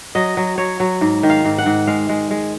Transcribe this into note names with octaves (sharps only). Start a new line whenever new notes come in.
F#3 D#5
F#3
F#3 C#5
F#3
G#2
D#3
F5
G#2
F#5
G#2
G#3 F5
G#3
G#3